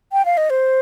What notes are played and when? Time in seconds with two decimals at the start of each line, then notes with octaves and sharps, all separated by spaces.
0.12 G5
0.25 F5
0.37 D#5
0.50 C5